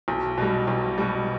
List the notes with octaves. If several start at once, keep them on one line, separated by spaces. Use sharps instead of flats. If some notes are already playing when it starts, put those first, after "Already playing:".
B1
B2 G3
B1
B2 G3